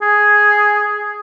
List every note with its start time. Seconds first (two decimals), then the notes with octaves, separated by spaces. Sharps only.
0.02 G#4